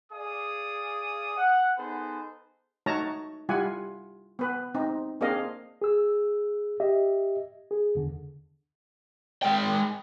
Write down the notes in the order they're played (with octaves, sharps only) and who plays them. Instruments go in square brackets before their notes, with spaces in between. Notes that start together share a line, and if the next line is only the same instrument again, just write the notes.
[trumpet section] G#4 D5 F5 D#6
F#5
B3 D#4 G#4 A4 B4 C5
[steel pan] A3 D#4 F#4 C#5 A5 A#5
G3 E4 F4 F#5 G#5
B3 B4
C4 D#4
A#3 C4 D4 G#4 D#5 F5
[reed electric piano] G#4 E6
G4 D#5 E5
G#4
E2 D3
[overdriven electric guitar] G#3 G5